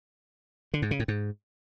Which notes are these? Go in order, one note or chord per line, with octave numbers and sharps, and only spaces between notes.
D3
G#2
C#3
A2
G#2